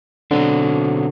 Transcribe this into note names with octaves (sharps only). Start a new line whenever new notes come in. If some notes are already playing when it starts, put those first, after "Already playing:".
B2 D3 F#3 C4